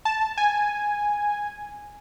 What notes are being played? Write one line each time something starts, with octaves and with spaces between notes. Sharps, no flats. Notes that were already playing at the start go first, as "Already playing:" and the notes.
A5
G#5